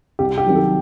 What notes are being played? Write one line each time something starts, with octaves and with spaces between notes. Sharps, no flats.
C2 G4
G4
C3 D#3 F#3
A4